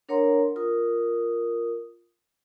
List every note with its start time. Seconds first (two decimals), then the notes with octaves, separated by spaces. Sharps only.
0.09 D4 A#4 C#5 F#5 A#5 C6
0.56 F4 A#4 D#6